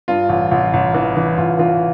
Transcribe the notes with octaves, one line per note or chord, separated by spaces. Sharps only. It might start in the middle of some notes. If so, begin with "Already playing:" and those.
G2 F4
A1
A1
A1
E3
E3
A1 F4
E3 F4